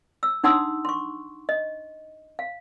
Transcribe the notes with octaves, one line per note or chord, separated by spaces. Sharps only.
E6
D4 D#4 F#5 C6 D#6 E6
C6 C#6
D#5
F5